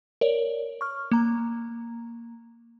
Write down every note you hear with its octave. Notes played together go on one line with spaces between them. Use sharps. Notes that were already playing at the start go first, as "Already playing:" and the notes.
A#4 C#5 D5
C#6 F6
A#3 A#5